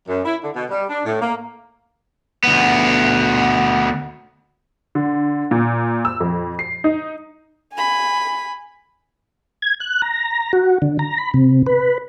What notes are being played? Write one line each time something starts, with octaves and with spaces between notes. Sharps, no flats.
F#2
E4
D3
B2
G3
D4
A2
A#3
D2 B3
D3
A#2
E6
F2
C7
D#4
G#5 B5
G#6
F#6
A#5
F#4
D3
A#5
B5
C3
B4